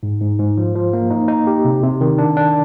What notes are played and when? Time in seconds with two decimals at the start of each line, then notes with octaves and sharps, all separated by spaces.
0.03 G#2
0.21 G#2
0.39 G#2
0.57 F3
0.75 F3
0.93 A#3
1.10 D#4
1.28 D#4
1.47 G4
1.65 C3
1.83 C3
2.01 D#3
2.18 D4
2.37 D4